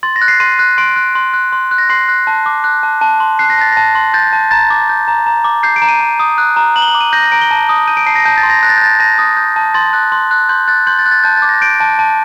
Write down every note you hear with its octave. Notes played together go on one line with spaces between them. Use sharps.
C6 A6
A#6
F#6
C7
C6 D#7
F#6
C6 D7
F#6
C6
F#6
C6
F#6
A#6
C6 C7
F#6
A5
D6
F#6
A5
A5
C6
F#6 C7
A#6
A5 A6
A5 A#6
C6
G6 A6
A5
A#5 A6
D6
G6
A#5
A#5
D6
G6 C7
D7
A#5
D#7
A#5
D#6
F#6
A#5
A#5 F#7
G7
F#7
D6
D#7
G6 A#6
A#6
A#5 D7
G7
A5
D#6
G6 D#7
D7
A5 C7
A#6
A5 G6
A6
C6
A#6
F#6 A#6
A6
G6
A5 A6
A5 A#6
D#6
G6
A5
C6 A6
F#6
C6
F#6
C6 G6
F#6 A6
C6 G6
A6
F#6
A6
A5 G6
A6
D6
A#6
G6 D7
A5
A5